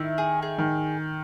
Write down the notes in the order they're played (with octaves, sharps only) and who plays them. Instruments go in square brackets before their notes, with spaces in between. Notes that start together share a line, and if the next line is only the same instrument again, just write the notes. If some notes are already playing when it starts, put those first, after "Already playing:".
Already playing: [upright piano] D#3 [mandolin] E4
[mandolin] G#4
G#4
[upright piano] D#3